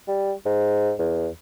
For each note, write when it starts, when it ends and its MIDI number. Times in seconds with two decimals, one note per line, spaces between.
0.08 0.32 55
0.46 0.92 44
0.99 1.29 40